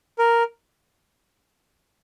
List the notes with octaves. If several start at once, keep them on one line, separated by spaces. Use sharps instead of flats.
A#4